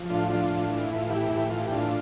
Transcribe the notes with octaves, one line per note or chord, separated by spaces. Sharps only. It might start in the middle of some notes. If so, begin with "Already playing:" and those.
Already playing: F3
A2 D4 F4
F3 D4 F4
A2
E3
E4
A2
F4
E3 E4 G4
A2 E4 G4
E3 F4
G4
A2 D4 F4